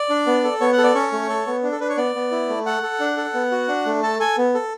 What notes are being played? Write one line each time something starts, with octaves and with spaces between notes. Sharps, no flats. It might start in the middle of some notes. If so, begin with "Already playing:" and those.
Already playing: D5
D4
B3
A4
B3 C#5
F#5
A4
D5
C#4 C#5
A3
A4
B3
D4
A4
D4 B4
C#5
B3 D5
B3
E4
A3
A4 F#5
A4
D4
A4
B3
F#4
D4
A3
A4 A5
A4 G#5
B3
A4